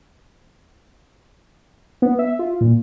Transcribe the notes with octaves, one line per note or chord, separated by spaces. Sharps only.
B3
E5
F4
A#2